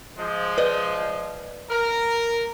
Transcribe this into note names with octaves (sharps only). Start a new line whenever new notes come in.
F3 G#3
B4 D5 D#5
A#4